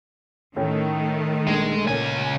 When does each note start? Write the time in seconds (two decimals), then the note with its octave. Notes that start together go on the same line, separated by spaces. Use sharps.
0.56 A2 D#3 A3 C#4
1.47 A#1 G#3
1.86 C#2 A#2 C#4 G#5